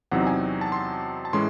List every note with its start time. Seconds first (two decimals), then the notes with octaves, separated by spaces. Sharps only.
0.11 E2 C3 F#3 C4 D#4 F#5
0.27 G#5
0.61 A5
0.72 C6
1.25 A5
1.33 A2 E3 G#3 C#4 C6